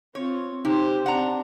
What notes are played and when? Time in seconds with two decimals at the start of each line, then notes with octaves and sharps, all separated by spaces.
0.15 C4 F4 C#5
0.65 C3 D#4 G4 C5
1.06 C4 D4 F#5 A#5